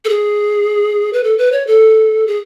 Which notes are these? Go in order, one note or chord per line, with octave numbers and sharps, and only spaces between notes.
A4
G#4
B4
A4
B4
C#5
A4
G#4